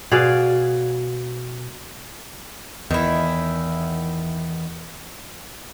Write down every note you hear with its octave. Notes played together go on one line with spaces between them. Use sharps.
B2 G#4 D5 F5
E2 D#3 E4